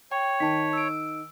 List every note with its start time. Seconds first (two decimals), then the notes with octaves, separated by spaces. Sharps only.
0.11 C#5 G5
0.40 D#3 A5 B6
0.73 E6 D7